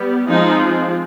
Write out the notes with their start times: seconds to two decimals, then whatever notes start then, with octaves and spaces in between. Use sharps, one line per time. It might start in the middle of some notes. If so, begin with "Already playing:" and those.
Already playing: G3 B3
0.29 F3 G#3 C4 D#4